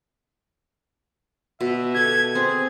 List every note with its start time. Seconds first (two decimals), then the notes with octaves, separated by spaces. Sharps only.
1.61 B2 E5
1.95 G4 A4 G#6
2.35 C4 G#4